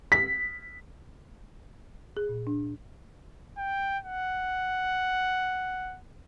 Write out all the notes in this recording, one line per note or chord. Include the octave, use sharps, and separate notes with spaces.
B6
G#4
A#2
D4
G5
F#5